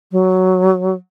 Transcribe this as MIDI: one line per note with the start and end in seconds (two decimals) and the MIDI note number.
0.12 0.95 54